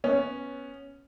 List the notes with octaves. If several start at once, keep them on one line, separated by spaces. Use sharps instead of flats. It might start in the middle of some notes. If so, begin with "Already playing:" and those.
B3 C#4